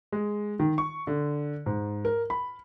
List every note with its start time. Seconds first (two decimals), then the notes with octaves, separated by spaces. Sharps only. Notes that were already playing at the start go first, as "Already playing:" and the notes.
0.12 G#3
0.60 D#3
0.78 C#6
1.07 D3
1.66 G#2
2.05 A#4
2.30 B5